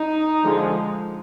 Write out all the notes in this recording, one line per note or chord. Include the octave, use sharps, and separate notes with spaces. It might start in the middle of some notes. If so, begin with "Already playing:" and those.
Already playing: D#4
D3 F3 G#3